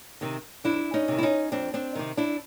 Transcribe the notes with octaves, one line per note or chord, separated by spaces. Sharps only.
C3 D#3
F2 D4 E4
C#4 D#4
C3 D#3
E4
C#4 D#4
F2 C4 D4
C4 D4
C3 D#3
D4 E4